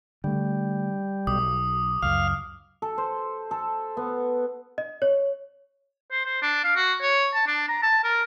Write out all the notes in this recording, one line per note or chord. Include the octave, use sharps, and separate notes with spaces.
D3 G3 A3
B1 D6 D#6
C#2 F#2 F5 F6
A4
C5
A4
B3
D#5
C#5
C5
C5
D4
F5
F#4
C#5
A5
D4
A#5
A5
A#4